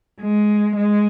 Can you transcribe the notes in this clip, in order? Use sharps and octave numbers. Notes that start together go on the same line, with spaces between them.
G#3
G#3